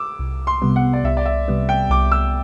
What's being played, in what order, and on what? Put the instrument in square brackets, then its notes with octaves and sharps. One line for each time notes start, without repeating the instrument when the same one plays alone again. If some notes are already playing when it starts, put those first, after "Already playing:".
Already playing: [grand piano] D6 E6
[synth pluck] C2
[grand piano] C6
[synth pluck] C3 G3 B3
[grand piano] F#5
D5
[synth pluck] C2 [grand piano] E5
[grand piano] D5
E5
[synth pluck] C3 G3 B3
[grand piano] G5
[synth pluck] C2 [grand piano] D6
[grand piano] E6